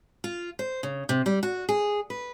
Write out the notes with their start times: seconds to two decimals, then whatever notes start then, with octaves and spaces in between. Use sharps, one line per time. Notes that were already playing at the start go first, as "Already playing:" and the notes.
0.24 F4
0.59 C5
0.83 C#3
1.09 C3
1.26 G3
1.43 F#4
1.69 G#4
2.10 B4